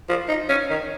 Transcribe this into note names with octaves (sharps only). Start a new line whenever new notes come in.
F3
D#4
C#4
D#3